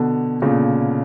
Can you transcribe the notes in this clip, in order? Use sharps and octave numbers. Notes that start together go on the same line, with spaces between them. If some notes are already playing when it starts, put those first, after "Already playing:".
Already playing: B2 D3
A#2 C#3